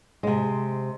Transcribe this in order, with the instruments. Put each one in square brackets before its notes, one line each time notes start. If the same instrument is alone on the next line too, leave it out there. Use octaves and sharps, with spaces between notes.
[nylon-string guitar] C3 G#3